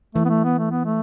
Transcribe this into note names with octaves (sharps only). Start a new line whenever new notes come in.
E3 A3
B3
A3
B3
A3
B3
A3